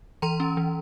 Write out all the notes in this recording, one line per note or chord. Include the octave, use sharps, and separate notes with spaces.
E3 A#5 C6
C#4
E3